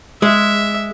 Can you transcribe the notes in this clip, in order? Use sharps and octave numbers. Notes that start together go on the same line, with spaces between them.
G#3 E5